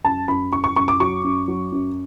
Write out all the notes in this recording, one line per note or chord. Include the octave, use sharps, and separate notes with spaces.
F#2 A5
F#2 B5
F#2 C#6
C#6
F#2 C#6
D6
F#3 C#6
F#2
F#3
F#2